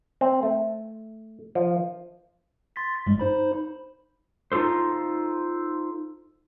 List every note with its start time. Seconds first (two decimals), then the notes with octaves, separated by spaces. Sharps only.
0.21 C4
0.43 A3
1.55 F3
2.76 C6 A6 B6
3.06 G2 G3 G#3
3.19 D#4 C5 B5
4.52 D#4 F4 G4 A4 C5